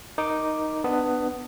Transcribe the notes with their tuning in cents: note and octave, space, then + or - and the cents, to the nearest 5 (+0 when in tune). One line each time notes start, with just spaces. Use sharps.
D#4 +0 A#4 +0 D6 +0
B3 +10 D4 +20